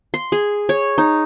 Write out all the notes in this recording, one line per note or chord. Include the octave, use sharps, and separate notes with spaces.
C6
G#4
C#5
D#4